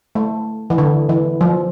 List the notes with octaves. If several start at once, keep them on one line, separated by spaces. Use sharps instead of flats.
A3
E3
D3
E3
F3